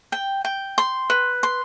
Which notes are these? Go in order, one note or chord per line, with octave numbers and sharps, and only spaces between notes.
G5
G5
C6
B4
C6